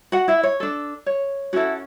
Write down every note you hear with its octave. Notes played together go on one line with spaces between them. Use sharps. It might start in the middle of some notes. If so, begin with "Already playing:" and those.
F#4 F#5
E4 E5
C#5
D4 A4
C#5
C#4 E4 F#4 A4 F#5